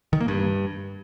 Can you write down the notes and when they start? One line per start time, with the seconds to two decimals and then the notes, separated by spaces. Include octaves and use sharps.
0.13 D#3
0.20 A#3
0.28 G2